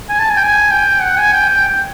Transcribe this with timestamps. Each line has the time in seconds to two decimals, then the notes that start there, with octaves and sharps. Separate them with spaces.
0.09 G#5
0.19 A5
0.29 G#5
0.36 G5
0.44 G#5
0.71 G5
1.01 F#5
1.17 G#5
1.33 G5
1.49 G5